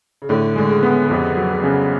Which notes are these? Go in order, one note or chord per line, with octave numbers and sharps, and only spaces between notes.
C#3
A2 D3
D3 G#3
C#3
B3
C#3
F2 C3
F#3
C#3
C#3